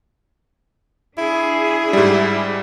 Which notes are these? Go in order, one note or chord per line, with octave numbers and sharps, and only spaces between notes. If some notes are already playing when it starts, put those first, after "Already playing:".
D4 E4 G#4
G#2 G3